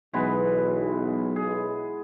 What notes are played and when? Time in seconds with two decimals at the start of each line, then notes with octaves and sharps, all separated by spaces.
0.14 B1 E3 G#3 B3
1.36 G#4